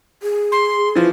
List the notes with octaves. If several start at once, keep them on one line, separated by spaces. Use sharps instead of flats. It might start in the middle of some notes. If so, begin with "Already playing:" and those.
G#4
C6
E3 F3